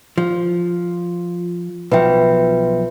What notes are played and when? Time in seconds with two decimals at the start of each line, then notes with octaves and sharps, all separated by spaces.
0.18 F3
1.92 B1 F3 B4 E5 G5